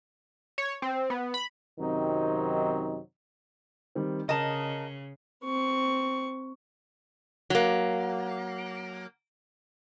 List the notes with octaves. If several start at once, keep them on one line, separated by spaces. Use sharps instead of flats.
C#5
C4
B3
B5
F#2 C3 D#3 F#3 C4 D#4
D#3 G3 C4
C#3 A#4 D#5 A5
C4 C#6
F#3 A#3